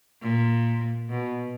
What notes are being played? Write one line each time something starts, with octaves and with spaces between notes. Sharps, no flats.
A#2
B2